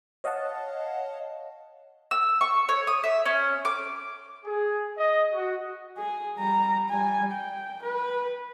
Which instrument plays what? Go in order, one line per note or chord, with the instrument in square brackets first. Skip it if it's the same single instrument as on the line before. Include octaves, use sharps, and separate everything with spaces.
[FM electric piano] C#5 D#5 F5 F#5 A5
[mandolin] E6
C#6
C#5
D#6
E5
C#4
D6
[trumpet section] G#4
D#5
F#4
[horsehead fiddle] G#4
G3 A#5
G3 G#5
G5
B4